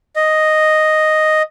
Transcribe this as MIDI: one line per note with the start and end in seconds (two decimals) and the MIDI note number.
0.16 1.42 75